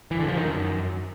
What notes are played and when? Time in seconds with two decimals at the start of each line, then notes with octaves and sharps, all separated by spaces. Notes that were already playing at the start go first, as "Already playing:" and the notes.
0.11 E3
0.20 D3
0.28 F3
0.37 D#3
0.46 F#2